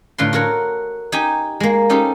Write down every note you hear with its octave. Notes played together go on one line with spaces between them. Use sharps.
A2 D3 F4 B4 C6
F#4 A4 A#4 C#5 F#5
D#4 G4 G5 G#5
G#3 A#3
C#4 D#4 G4 A4 C5